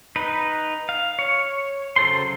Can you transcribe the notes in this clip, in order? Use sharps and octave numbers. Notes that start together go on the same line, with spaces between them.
D#4 B4
F5
C#5
C#3 F#3 A4 C5 C6